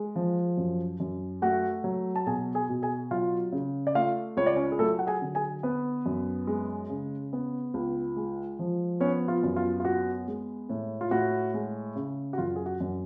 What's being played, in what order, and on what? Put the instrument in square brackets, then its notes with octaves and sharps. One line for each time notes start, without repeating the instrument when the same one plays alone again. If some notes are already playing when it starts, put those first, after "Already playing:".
Already playing: [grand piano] G#3
F3
F#2
F#2
A3 F#4 F#5
F#3
A5
B2 G#4 G#5
G#4 G#5
B2
G#4 G#5
F#3 F4 F5
C#3
D5
A3 F4 F5
C#2 C#5
D5
C#4 C#5
G#4
F#3 A3 A4
F#5
G#4 G#5
D3
G#4 G#5
B3 B4
F#2
G#3
C#3
B3
C#2
G#3
F3
B3 C#4 C#5
F4
F#2
F4
F4
B3 F#4
G#3
A2
F4
A2 F#4
G#3
C#3
F#4
F#2 F4
G#4
F#4
F#2